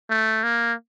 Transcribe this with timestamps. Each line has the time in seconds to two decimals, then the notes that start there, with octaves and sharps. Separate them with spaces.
0.10 A3
0.43 A#3